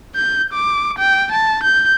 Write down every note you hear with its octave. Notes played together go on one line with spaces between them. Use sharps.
G6
D6
G5
A5
G6